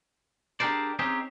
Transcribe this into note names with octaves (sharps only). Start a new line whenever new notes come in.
D4 G4 G#4 A#4 C5 D5
C4 C#4 D#4 G4 G#4 C5